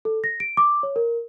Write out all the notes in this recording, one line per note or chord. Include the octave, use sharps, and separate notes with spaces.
A4
A#6
D7
D6
C#5
A#4